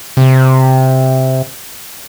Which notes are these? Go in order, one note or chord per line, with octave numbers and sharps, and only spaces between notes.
C3